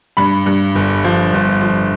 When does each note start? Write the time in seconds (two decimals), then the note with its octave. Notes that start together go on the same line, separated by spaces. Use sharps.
0.17 G2 B5
0.46 G2
0.75 G1
1.04 F3
1.33 G1
1.62 F3